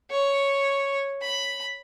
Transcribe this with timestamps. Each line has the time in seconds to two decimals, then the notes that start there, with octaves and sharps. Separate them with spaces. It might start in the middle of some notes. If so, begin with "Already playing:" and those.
0.10 C#5
1.22 B5